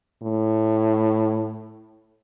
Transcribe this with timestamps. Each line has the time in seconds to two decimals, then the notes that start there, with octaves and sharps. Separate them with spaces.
0.22 A2